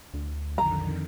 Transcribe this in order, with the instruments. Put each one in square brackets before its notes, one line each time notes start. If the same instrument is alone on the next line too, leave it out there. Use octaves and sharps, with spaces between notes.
[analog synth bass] D2
[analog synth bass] B1 [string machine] F2 D3 D#3 [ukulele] A#5